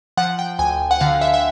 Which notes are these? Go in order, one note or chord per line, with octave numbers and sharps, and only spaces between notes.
F3 F#5
G5
D2 G#5
F#5
D3 F5
E5
E5